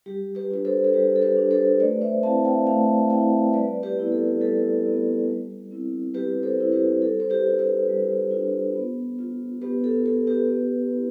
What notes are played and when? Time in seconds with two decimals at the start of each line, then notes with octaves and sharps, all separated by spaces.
0.06 G3 G4
0.35 G4 B4
0.51 D4 F4 B4
0.65 A4 C5
0.85 A4
0.93 G3 G4 B4
1.16 A4
1.22 G4 B4
1.37 D4 F4
1.51 A4 C5
1.80 A3 B4 D5
2.01 C5 E5
2.23 C4 E4 F5 A5
2.45 E5 G5
2.67 A3 F5 A5
3.10 C4 E4 E5 G5
3.53 G3 B4 D5
3.83 G4 B4
3.97 B3 E4
4.12 A4
4.41 G3 A4
4.85 B3 E4
5.28 G3
5.71 C4 E4
6.14 G3 G4 B4
6.43 A4 C5
6.58 C4 E4
6.72 G4 B4
7.02 G3 A4
7.20 C5
7.30 G4 B4
7.45 D4 F4
7.59 G4 B4
7.89 G3
8.31 D4 F4
8.75 B3
9.19 F4
9.62 B3 G4 B4
9.84 A4
10.05 F4 A4
10.27 G4 B4
10.48 B3
10.92 E4